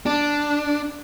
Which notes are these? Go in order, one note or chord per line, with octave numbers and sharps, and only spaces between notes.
D4